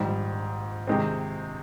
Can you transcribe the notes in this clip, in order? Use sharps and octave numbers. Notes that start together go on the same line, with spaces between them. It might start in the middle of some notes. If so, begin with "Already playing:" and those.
Already playing: A#1 G#2 D#3 G3
C3 D#3 G#3 C4